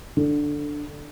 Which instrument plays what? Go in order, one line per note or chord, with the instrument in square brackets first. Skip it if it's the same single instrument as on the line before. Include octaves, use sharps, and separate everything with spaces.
[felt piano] D3